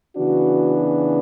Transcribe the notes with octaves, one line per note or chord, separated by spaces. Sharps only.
C#3 E3 B3 D4 F#4